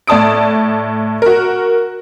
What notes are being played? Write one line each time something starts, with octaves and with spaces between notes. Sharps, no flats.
A2 D5 A5 D#6 D7
F#4 A#4